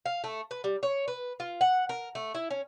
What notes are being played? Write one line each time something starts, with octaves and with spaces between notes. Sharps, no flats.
F5
A3
B4
G3
C#5
B4
F4
F#5
A#4
A3
E4
C#4